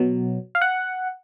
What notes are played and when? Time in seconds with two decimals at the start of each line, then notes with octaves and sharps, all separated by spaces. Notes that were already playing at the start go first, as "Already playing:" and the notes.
Already playing: B2 F#3
0.55 F5
0.61 F#5